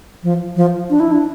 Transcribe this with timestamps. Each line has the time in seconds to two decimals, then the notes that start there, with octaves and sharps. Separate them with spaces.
0.23 F3
0.56 F3
0.90 D4
1.00 E4
1.12 D4